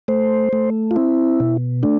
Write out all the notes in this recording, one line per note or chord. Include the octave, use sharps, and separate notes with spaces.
A3 C5
A3
F4
C4 E4
B2
A3 D4